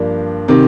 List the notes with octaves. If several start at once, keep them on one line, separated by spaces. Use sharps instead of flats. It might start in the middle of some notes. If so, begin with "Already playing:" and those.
Already playing: G2 F3 A#3 D4 G4
C3 D#3